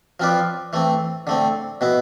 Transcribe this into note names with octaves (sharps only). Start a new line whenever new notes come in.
F3 C4 F4 B4 D5
E3 A3 C4
D3 A3 C4
B2 B3 E4